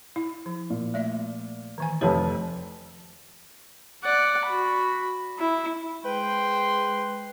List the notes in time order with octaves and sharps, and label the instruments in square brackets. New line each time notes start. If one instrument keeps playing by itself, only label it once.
[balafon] E4
F3
[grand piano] A#2
[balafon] A3 D5 E5
D#3 E3 G#5
[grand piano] F1 F2 [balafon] G4 B4 C#5
[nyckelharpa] D5 F#5
F#4 B5
E4
[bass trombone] G#3 [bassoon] B4 [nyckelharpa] C5 G5 [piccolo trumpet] C6